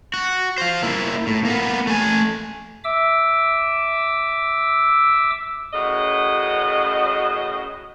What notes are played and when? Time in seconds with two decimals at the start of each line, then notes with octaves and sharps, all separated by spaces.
0.14 F#4
0.58 C5 F5
0.83 A#3 E4
1.27 A2
1.45 A#3 B3
1.87 A3 G#5
2.84 E5 D6 E6
5.74 F#2 A2 C#3 F#4 D#5